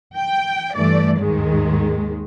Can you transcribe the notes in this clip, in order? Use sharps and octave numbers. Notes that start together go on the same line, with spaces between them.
G5
G2 E3 A3 D5
D#2 G#2 D#3 G#3